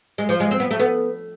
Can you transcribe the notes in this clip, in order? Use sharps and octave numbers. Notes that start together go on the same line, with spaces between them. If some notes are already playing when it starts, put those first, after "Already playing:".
G#3
F3
G#3
C4
B3
A3
B3